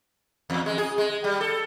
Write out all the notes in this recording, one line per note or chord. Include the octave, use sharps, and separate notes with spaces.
E2
G#3
G#4
G#3
G3
A4